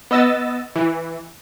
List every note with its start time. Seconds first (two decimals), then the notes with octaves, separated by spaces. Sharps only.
0.11 B3 D#5 E6 A6
0.76 E3